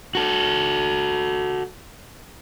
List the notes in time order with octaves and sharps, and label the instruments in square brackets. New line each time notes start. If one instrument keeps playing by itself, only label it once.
[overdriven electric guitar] F#4 A4